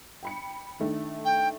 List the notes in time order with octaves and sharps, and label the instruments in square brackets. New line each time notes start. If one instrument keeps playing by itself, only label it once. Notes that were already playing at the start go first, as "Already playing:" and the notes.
[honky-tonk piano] G5 B5 C#7
D#3 A3 D4
[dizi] G5